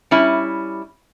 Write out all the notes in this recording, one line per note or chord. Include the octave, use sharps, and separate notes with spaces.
G3 C#4 E4